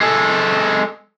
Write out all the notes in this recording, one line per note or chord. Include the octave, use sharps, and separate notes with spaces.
G#3 A4